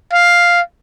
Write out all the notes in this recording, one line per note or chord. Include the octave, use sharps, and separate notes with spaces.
F5